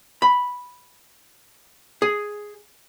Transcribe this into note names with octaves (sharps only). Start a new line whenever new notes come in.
B5
G#4